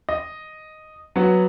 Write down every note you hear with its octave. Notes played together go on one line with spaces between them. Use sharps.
D#5
F#3 B3 F#4